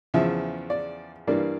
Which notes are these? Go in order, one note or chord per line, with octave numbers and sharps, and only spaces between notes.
E2 C#3 F3 E5
D5
G2 E3 G3 A#3 D5